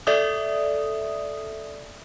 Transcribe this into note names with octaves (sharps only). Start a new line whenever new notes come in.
A4 D5 E5 D#6